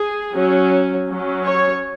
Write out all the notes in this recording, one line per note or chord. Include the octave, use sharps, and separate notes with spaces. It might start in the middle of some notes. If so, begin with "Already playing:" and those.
Already playing: G#4
F#3 C#4
F#3 C#4
C#5